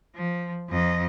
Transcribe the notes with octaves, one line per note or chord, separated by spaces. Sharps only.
F3
F2 D#5